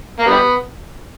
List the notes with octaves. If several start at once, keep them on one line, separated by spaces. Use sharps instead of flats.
A#3
G3 B3